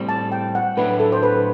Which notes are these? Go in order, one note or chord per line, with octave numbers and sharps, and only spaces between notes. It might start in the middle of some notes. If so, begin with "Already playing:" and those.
Already playing: A2 G3 C4
A5
G5
F#5
A2 F#3 A3 D4 B4
A4
C5
B4